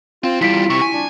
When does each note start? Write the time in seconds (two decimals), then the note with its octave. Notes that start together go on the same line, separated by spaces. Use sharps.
0.24 C4 F4
0.41 E2 G3 E4 F4 B6 D7
0.70 C3 C#6
0.82 G#5
0.93 D4